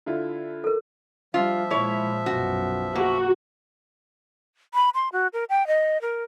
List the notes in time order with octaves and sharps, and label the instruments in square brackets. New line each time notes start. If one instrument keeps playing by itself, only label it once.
[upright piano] D3 E4 F4
[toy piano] A4 A#4
[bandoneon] F3 E5 [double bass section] G3 [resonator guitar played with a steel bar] F4
[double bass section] A#2 G#3 [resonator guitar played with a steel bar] E4 C#5
[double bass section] B1 F#2 B2 [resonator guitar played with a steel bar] F#4
[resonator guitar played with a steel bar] A#3 [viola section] F#4
[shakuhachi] B5
C6
F#4
A#4
G5
D#5
A#4